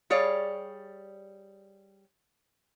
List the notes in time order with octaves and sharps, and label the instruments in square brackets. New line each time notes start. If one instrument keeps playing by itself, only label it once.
[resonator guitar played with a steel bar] G3 G#4 C#5 D5 F5